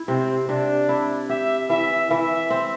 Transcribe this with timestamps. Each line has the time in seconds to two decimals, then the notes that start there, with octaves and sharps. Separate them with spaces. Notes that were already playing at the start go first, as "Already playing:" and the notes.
Already playing: E4
0.08 C3 C4
0.49 C3 D4
0.89 E4
1.29 G4 E5
1.69 E3 E5
2.10 E3 E5
2.50 C4